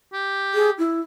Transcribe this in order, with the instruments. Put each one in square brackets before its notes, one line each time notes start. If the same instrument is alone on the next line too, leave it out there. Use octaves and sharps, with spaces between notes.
[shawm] G4
[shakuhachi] G#4
E4